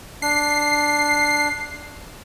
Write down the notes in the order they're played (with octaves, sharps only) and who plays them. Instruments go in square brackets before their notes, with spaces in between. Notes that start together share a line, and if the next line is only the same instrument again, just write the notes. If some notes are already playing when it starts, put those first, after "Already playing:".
[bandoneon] D4 [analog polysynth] C7